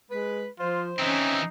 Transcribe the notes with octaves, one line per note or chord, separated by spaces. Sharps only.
G#3 B4
F3 F4 C5
E3 C4 C#4 D#4